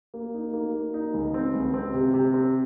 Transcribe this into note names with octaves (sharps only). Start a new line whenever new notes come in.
A#3
D#4
A#3
A#3
D#4
C#2
C4
C#2
C4
C3
C3
C4